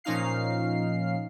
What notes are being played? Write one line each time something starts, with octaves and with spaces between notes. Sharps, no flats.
A#2 F3 C#4 D#4 F5 C7